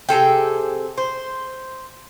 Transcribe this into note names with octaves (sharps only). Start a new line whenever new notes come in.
C3 G#4 A4 G5
C5